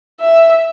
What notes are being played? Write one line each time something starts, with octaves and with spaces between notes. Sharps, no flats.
E5